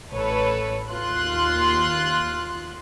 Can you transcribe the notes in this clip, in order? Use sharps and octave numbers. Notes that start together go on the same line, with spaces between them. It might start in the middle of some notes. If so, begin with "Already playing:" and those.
A1 A4 B4 C#5
D#2 F4 C6 F#6